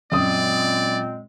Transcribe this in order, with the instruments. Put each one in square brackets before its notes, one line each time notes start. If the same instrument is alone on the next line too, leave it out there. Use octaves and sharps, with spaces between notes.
[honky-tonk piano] F#2 D#6 [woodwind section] A#2 G#3 C4 [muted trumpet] D5